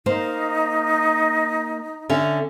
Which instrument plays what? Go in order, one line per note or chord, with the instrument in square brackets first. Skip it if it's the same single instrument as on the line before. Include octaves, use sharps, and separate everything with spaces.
[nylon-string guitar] A#3 C5 [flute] D#4
[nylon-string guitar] D3 C#4 E5